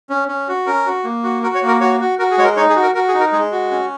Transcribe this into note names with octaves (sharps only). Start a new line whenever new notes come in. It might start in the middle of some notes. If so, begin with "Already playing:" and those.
C#4
C#4
F#4
C#4 A#4
F#4
A#3
F#4
F#4 A#4
C#5
A#3
A#4
F#4 C#5
F#4
F#4 A#4
G#4
G#3 C#5
A#4
D#4 C#5
G#4
F#4
A#4
F#4 A#4
G#4
D#4
A#4
G#3 G#4
F#4
C#4